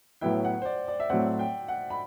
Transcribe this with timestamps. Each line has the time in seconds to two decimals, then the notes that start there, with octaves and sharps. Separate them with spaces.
0.21 A2 F#3 B3 E4 G5
0.45 F#5
0.62 C5
0.65 D5
0.88 D5
1.00 E5
1.09 A2 F#3 A3 C4 F#5
1.39 G5
1.68 F#5
1.90 B5